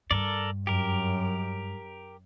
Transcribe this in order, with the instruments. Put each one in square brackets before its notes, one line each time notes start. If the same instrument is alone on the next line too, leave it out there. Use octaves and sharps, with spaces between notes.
[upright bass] G2 [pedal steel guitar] A4 A#4 D5
[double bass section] F#2 [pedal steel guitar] G4 A#4